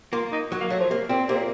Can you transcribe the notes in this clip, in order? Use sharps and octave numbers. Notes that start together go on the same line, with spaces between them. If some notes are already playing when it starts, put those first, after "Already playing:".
A#3 F4
D#4
F#3
A#3
F#3 A3
F3
C3 A#3
A#2 C4
C3 A#3
A#2